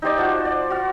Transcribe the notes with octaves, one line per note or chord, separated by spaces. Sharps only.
D#4 G4 C5 D5
F3 F#4 C5
D5
F#4 F5